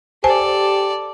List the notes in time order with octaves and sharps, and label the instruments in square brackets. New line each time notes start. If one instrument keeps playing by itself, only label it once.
[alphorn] G4 [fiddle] A4 D5 [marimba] C5 G#5 A5